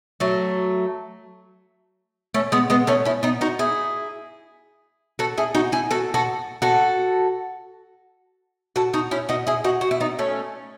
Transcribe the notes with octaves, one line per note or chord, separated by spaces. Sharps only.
F#3 A3
A3 C#4
G#3 B3
G#3 B3
A3 C#4
C#4 E4
B3 D#4
D#4 F#4
E4 G#4
F#4 A4
E4 G#4
D#4 F#4
E4 G#4
F#4 A4
F#4 A4
F#4 A4
F#4 A4
D#4 F#4
C#4 E4
D#4 F#4
E4 G#4
D#4 F#4
F#4
E4
B3 D#4
A3 C#4